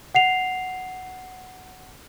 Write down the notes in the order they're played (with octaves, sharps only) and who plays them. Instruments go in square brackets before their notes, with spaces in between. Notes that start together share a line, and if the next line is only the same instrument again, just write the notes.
[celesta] F#5 C7 F7